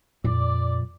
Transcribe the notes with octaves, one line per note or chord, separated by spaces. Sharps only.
F2 A#2 D5